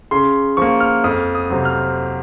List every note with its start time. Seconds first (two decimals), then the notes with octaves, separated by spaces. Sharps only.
0.11 C#3 C6
0.57 F3 A#3 C#6
0.80 F6
1.04 F2 D#6
1.35 D#6
1.50 C3 F#3 C4
1.65 F6